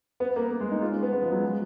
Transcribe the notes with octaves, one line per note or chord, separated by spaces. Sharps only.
B3
A#3
A#3
G#3
D#4
F4
C#4
B3
G#3
F3
F#3
G#3